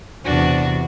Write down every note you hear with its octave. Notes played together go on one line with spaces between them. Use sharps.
E2 C3 D4 F#4